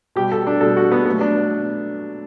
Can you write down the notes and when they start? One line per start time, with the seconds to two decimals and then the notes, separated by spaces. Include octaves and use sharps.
0.16 B2 G3 G4
0.32 A4
0.47 D4
0.61 B2 G3 A4
0.77 F#4
0.92 B3
1.05 B2 F#3 A3 B3
1.21 D4